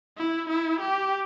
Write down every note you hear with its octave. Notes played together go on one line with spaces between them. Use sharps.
E4
E4
G4